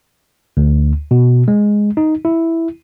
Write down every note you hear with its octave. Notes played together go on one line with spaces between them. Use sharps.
D2
B2
G#3
D#4
E4